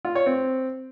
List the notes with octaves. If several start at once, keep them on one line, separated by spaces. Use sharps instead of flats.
F4
C#5
C4